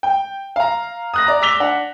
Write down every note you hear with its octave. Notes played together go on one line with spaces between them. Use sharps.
G5
F5 A#5
D#6 F#6 A#6
D5 A#5
D6 E6 B6 F7 G7
D4 F#5